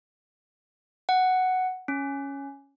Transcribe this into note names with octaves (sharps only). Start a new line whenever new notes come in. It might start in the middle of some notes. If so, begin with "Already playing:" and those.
F#5
C#4